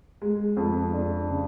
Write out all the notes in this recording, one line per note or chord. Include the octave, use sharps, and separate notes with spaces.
G#3
F2
D4
C#3